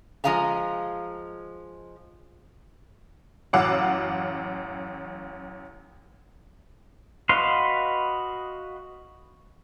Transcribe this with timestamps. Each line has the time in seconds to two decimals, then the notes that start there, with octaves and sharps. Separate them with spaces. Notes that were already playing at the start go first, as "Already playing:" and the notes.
0.24 F3 G#3 D#5 F5 A#5
3.53 A1 F#2 F5 F#5 D6 E6
7.29 F#4 B4 D#5 F5 C6